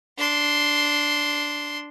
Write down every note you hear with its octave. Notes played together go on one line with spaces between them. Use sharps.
D4 C6